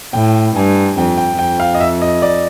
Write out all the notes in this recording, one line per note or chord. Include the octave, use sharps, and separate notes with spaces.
A2 G5
G2 G#5
F2 G5
G5
F2 G5
F5
D#5
E5
D#5
D5